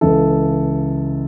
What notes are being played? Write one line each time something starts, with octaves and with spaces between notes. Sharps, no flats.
C#2 C#3 E3 A4